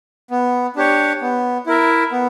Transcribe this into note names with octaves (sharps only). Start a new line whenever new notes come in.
B3
D4 G4 C#5
B3
E4 A#4 E5
B3